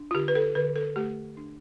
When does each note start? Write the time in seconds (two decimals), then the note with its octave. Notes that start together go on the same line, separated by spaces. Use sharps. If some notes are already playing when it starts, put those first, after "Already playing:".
Already playing: D4
0.11 F4
0.14 D3 G4
0.28 B4
0.35 A4
0.55 D3 B4
0.76 A4
0.96 A3 G4
1.37 D4